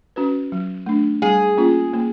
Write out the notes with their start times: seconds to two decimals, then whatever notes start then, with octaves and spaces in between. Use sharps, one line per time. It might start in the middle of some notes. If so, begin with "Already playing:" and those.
0.16 C#4 F#4 B4
0.52 F#3
0.86 A3 D4
1.22 G3 G#4
1.57 A#3 C#4 F4
1.93 A#3